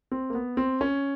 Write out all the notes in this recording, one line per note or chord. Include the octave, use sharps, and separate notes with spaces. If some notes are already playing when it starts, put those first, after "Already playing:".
C4
A#3
B3
C4
C#4